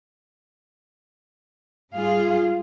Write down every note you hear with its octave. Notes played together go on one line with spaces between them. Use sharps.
G#2 G3 F4 G#4 F5